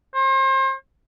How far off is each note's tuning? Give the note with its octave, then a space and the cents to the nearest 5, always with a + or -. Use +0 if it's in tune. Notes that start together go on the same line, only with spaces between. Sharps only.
C5 +35